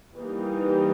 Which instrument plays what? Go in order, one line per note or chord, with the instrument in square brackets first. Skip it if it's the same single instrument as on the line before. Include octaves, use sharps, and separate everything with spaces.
[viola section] E3 G3 A#3 D#4